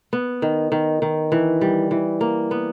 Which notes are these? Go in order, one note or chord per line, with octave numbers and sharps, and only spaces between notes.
B3
D#3
D#3
D#3
E3
G3
E3
A#3
B3